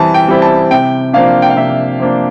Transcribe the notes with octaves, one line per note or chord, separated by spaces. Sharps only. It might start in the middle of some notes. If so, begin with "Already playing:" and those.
Already playing: E3 G3 C4 E4 A5
G5
G3 C4 E4
A5
C3 G5
F3 A#3 D4 F5
G5
F5
C3 E5
F3 A#3 D4